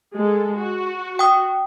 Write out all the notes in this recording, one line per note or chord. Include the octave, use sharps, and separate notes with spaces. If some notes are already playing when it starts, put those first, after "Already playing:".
G#3 A4
F#4
G5 D#6